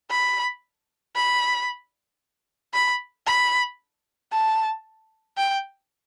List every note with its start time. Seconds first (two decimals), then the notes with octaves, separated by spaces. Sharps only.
0.10 B5
1.16 B5
2.74 B5
3.27 B5
4.32 A5
5.38 G5